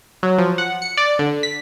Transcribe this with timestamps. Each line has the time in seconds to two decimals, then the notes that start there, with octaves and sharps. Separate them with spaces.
0.23 F#3
0.38 F3
0.58 F#5
0.82 C#7
0.97 D5
1.19 D3
1.43 B6